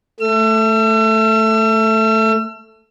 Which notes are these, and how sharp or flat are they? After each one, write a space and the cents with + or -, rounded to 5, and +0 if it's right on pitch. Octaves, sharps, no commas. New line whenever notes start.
A3 +0 E6 +40